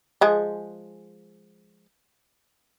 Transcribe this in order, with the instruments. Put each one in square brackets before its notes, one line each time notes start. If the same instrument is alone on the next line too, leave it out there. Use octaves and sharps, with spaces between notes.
[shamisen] F3 G#3 G#4